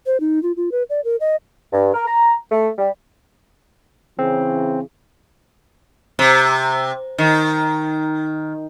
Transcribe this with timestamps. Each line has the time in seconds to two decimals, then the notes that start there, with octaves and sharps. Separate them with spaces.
0.06 C5
0.20 D#4
0.43 F4
0.57 F4
0.72 B4
0.90 D5
1.05 A#4
1.20 D#5
1.72 G2
1.93 A#4
2.07 A#5
2.51 A3
2.78 G3
4.19 C#3 E3 C4 G#4
6.19 C3
7.18 D#3